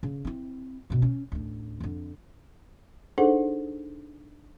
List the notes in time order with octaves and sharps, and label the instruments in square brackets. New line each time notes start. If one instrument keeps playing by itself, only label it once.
[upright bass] C#3
C4 E4
G2 B2
C#4
A1 D2
F2 D3
[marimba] D4 D#4 G#4 A4 C5 F#5